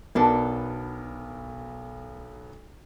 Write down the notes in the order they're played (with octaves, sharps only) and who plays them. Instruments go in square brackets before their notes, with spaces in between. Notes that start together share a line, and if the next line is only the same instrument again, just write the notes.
[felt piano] B1 B3 A#4 [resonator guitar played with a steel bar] B2 D4 A4